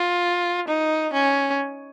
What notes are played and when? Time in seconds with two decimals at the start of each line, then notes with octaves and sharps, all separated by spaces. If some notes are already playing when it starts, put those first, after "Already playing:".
Already playing: F4
0.68 D#4
1.13 C#4